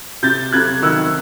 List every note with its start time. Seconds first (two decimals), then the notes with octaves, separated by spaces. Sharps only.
0.23 C3 G6 A6
0.52 C3 F#6 G#6
0.82 D#3 E6 F#6